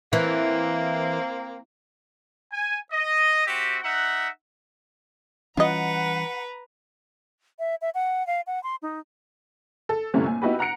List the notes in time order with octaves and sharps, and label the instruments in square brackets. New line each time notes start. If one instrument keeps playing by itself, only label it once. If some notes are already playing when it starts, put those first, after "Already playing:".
[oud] E3 [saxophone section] A#3 C4
[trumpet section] G#5
D#5
C4 F#4 G4 E5
D#4 E5 F#5
[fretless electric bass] E3 G3 C#4 [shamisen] F4 D#5 [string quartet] B4 A#5 [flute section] F#5
[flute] E5
E5
F#5
F5
F#5
C6
D#4
[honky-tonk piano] A4
G1 C3 A3 C4 C#4 E4
A#2 G#5
B3 D#4 E4 F#4 G4 B4
F#5 A#5 F#6 C#7 D7